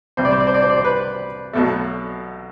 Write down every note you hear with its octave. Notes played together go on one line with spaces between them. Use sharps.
C2 C3 G3 C5
D5
C5
D5
C5
D5
C5
D5
C5
B4
B1 B2 A3